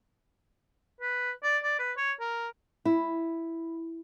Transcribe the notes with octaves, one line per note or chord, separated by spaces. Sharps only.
B4
D5
D5
B4
C#5
A#4
E4